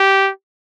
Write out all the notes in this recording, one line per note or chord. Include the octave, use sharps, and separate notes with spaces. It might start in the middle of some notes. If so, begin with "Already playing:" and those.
Already playing: G4